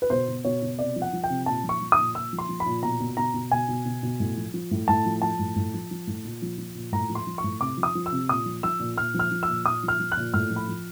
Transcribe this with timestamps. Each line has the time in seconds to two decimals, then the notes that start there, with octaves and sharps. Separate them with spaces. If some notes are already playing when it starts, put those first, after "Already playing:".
0.02 B4
0.10 B2 C5
0.28 B2
0.45 B2 C#5
0.62 B2
0.79 C3 D5
0.96 F3
1.02 F#5
1.13 F3
1.24 G5
1.30 C3
1.46 A#2 A5
1.63 F3
1.69 C#6
1.81 F3
1.92 D#6
1.99 A#2
2.15 A#2 E6
2.33 F3
2.38 C6
2.49 F3
2.60 B5
2.66 A#2
2.83 B2 A#5
3.00 B2
3.17 B2 A#5
3.34 B2
3.51 B2 G#5
3.68 B2
3.85 B2
4.03 B2
4.20 A2
4.37 F3
4.54 F3
4.71 A2
4.88 A2 A5
5.06 F3
5.22 F3 A5
5.39 A2
5.56 A2
5.74 F3
5.91 F3
6.07 A2
6.24 A#2
6.42 F3
6.58 F3
6.75 A#2
6.92 A2 A#5
7.09 F3
7.15 C6
7.27 F3
7.38 C#6
7.44 A2
7.60 C3 D6
7.77 F3
7.83 D#6
7.95 F3
8.06 E6
8.12 C3
8.29 A#2 D#6
8.46 F3
8.63 F3 E6
8.80 A#2
8.97 A#2 F6
9.14 F3
9.19 F6
9.31 F3
9.43 E6
9.48 A#2
9.66 A#2 D#6
9.83 F3
9.88 F6
9.99 F3
10.12 F#6
10.17 A#2
10.34 A2 F6
10.50 F3
10.56 B5
10.68 F3